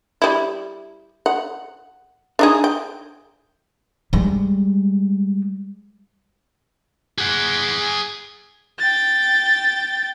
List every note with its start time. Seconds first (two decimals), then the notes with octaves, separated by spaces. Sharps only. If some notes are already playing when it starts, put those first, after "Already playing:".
0.22 G3 E4
1.26 F#5
2.39 D4 D#4 G#4
2.64 G5
4.13 G3 G#3
7.18 G#4 F#5
8.79 G5 A6